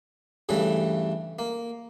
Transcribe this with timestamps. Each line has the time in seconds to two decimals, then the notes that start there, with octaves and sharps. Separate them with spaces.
0.49 G2 C#3 E3 A3
1.39 A#3